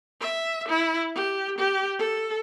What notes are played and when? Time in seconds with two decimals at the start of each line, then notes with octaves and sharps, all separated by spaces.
0.21 E5
0.69 E4
1.15 G4
1.58 G4
1.99 A4